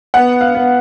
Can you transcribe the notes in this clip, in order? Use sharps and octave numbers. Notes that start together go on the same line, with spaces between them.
B3 F#5
F5
B3